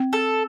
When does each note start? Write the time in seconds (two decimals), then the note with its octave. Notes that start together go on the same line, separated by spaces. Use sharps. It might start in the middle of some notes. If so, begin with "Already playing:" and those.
Already playing: C4
0.13 A4